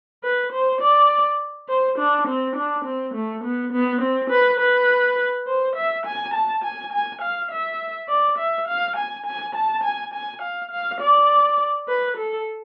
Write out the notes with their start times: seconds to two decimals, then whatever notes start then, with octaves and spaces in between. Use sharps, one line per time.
0.24 B4
0.53 C5
0.81 D5
1.68 C5
1.99 D4
2.27 C4
2.56 D4
2.85 C4
3.14 A3
3.44 B3
3.73 B3
4.02 C4
4.30 B4
4.60 B4
5.48 C5
5.76 E5
6.06 G#5
6.34 A5
6.64 G#5
6.92 G#5
7.22 F5
7.51 E5
8.09 D5
8.39 E5
8.68 F5
8.97 G#5
9.26 G#5
9.55 A5
9.84 G#5
10.14 G#5
10.42 F5
10.71 F5
11.00 D5
11.88 B4
12.17 A4